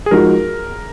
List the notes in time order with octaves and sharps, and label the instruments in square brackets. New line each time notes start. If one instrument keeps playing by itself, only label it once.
[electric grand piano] G#4
[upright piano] F3 G#3 D#4 F#4 [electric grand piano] A#4